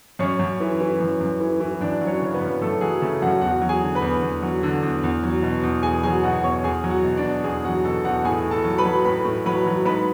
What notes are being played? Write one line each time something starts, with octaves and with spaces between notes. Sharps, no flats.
F#2 C#4 C#5
F#2
E3
E3
F#2
F#2
E3
E3
F#2 D4 D5
F#3
C#4 C#5
C#3
B3 B4
F#2
F#2 A3 A4
F#3 G#4
C#3 A3 A4
F#2 F#4 F#5
E2 F#4 F#5
F#3
G#4 G#5
D3
B4 B5
E2
E2
F#3
D3
E2
E2
F#3
B2
E2
E2 G#4 G#5
F#3 G#4 G#5
B2 F#4 F#5
E2 C#5 C#6
E2 G#4 G#5
F#3
F#4 F#5
B2
D4 D5
E2
E2 G#4
F#3 F#4 F#5
B2 A4 A5
E2 F#4 F#5
A2 G#4 G#5
A2
A4 A5
F#3
B4 B5
F#3
A2 B4 B5
A2
F#3 B4 B5
F#3
G#2 B4 B5